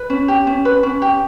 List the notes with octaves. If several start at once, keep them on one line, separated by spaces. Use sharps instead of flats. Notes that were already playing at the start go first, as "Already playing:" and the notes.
Already playing: B4
C#4
G4
C#4
B4
C#4
G4